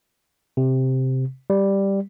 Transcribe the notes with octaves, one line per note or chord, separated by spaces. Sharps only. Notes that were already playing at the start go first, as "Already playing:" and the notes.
C3
G3